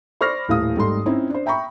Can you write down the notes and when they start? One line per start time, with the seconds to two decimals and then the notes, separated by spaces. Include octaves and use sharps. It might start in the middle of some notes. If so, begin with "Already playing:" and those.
0.21 C5 D5 B5 C#6 F6 A#6
0.48 D#1 A2 E3 F5 D#6
0.76 G#1 G3 A3 D#4 C6
1.06 C4 C#4 D#4 E4
1.30 D4 C5
1.46 E5 G5 A#5 B5 C#6